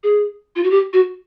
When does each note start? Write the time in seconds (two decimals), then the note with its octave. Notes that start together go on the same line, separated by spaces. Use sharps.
0.03 G#4
0.56 F4
0.63 F#4
0.71 G4
0.93 F#4